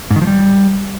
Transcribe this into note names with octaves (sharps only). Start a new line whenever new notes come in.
G#2
D#3
F3
G3